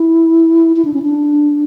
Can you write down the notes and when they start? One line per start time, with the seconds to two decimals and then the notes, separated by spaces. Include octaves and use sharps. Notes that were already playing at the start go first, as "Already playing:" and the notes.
Already playing: E4
0.76 E4
0.85 D4
0.94 C#4
1.02 D4